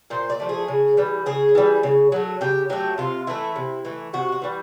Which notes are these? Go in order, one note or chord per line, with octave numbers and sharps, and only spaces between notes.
A#2 C5
D5
F3 A3
G#4
C#3
E3 G3
C#3 G#4
E3 G3
C#3
F#3 A3
C#3 G4
F#3 A3 G4
C3 F4
E3 A3 E4
C3
E3 A3
C3 F#4
F#4
E3 G3